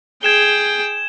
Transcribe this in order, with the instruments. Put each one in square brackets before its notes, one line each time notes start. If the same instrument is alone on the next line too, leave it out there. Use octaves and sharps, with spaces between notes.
[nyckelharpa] G#4 G5 [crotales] G#6 E7 G7